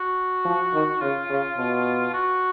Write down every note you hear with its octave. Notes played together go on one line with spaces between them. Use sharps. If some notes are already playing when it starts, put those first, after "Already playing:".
Already playing: F#4
F3
D#3
C#3 F4
C#3
B2
F#4